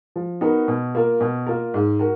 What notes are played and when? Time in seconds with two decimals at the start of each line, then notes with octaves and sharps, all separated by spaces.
0.16 F3
0.41 B3 D#4 F#4 A#4
0.68 B2
0.95 A#3 F4 A#4
1.21 B2
1.47 A#3 F4 A#4
1.74 G#2
1.99 F#4 A#4